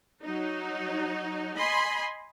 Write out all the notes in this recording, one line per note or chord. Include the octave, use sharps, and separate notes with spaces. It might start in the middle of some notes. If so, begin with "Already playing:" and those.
F#3 D#4
D#5 G#5 B5 C6